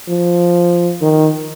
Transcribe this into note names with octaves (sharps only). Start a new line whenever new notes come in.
F3
D#3